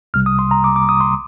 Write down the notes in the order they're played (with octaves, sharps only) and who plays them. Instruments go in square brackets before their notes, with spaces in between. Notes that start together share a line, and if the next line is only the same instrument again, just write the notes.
[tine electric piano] C2 C3 G3 F6
D#6
C6
A#5
D6
D6
D#6
C6